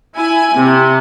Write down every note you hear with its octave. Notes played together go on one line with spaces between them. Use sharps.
E4 G#5
C3